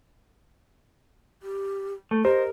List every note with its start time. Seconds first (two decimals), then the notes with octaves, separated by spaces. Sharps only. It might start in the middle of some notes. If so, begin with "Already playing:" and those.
1.43 G4
2.11 A3
2.25 G4 A#4 C5 D#5